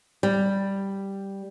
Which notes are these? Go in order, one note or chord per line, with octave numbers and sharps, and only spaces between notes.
G3